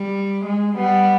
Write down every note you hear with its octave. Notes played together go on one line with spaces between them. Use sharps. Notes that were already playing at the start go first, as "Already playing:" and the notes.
Already playing: G3
G#3
G3 B3